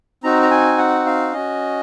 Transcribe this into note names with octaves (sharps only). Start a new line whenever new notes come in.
C4 D#4 F#4 A#5
A#5
G#5
F#5
F5
C#4 F#4 D#5